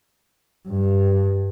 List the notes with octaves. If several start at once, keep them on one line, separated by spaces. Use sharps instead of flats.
G2